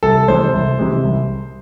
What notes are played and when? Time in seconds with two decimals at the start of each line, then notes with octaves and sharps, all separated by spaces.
0.03 C2 A4
0.28 C3 E3 G#3 C5
0.54 C2
0.79 C3 E3 G#3
1.03 C2